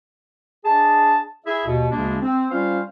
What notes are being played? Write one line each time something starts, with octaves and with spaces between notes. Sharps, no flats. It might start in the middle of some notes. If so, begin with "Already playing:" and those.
D4 G#4 D#5 A5
E4 G#4 E5
D#2 B2
D2 C#3 G#3 A#3 D4
C4
G3 C#4 F4 C5 F5